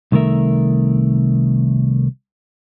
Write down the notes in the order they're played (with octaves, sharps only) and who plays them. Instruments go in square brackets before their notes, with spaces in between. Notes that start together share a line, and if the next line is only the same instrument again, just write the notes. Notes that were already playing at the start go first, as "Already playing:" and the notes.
[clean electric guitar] C2 D#3 A3 A#4 E5